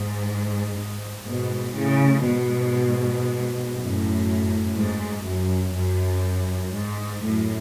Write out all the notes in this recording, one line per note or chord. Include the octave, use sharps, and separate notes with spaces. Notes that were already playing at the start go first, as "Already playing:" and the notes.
Already playing: G#2
G#2
G#2 B2
A2 C#3
G#2 B2
F#2 A2
G#2
F#2
F#2
G#2
F#2 A2